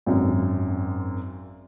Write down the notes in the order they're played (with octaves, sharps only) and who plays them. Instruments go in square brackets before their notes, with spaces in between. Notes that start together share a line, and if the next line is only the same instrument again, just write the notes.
[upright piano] G#1 F#2